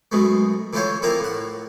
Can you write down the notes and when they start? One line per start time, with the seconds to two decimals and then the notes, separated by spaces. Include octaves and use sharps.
0.12 F#2 B2 G#3 A3
0.73 D3 E3 A3 F4 C5 C#5
1.02 F3 A#3 C4 E4 F4 A#5
1.20 A2 F#5